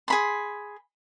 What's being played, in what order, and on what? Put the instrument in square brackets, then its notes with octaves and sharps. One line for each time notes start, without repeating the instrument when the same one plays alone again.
[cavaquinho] G#4 B5 C6